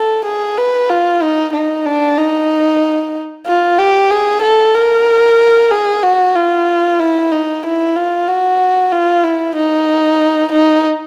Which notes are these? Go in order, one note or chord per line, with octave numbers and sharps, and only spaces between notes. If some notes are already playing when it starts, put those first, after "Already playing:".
Already playing: A4
G#4
B4
F4
D#4
D#4
D4
D#4
F4
G4
G#4
A4
A#4
G#4
F#4
F4
E4
D#4
E4
F4
F#4
F4
E4
D#4
D#4